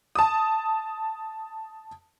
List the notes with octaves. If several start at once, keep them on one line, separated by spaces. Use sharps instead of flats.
A5 D#6